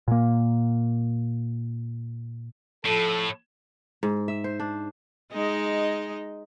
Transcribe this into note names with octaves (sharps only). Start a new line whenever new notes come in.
A#2 A#3
A2 F3 A4
G#2
E5
C5
D4
G#3 D#4 D#5